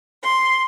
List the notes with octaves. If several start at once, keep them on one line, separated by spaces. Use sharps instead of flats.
C6